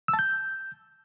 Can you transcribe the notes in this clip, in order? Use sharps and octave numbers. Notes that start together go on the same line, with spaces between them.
E6
A5
G6